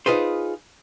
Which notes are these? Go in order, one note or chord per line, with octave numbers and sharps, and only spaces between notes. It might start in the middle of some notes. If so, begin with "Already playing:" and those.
D#4 F4 G#4 B4 C5